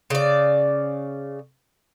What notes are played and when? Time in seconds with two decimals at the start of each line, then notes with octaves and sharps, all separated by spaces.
0.10 C#3 D5